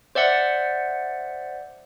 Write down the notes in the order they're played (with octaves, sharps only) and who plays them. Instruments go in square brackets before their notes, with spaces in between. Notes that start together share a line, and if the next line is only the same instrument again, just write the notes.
[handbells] C5 D5 E5 F#5